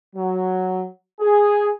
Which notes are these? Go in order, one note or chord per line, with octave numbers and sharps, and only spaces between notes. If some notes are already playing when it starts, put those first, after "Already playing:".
F#3
G#4